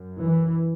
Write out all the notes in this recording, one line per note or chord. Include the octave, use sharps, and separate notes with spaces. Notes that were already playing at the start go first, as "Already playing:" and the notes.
Already playing: F#2
E3